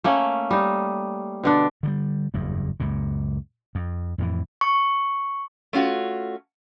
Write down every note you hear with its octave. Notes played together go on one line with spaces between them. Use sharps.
A3 A#3 C#4
G3 D#4
B2 D3 D4
D3 D#3 G3
F#1 E2 G2
C#2 F#2 A#2
F2
F2 A2 E3
C#6
A3 C#4 F4 F#4